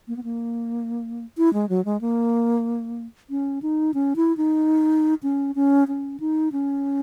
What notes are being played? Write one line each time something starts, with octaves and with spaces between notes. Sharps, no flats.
A#3
B3
A#3
E4
G#3
F#3
G#3
A#3
C#4
D#4
C#4
E4
D#4
C#4
C#4
C#4
D#4
C#4